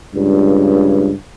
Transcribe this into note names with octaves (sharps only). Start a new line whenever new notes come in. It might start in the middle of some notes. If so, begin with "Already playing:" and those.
C#2 G2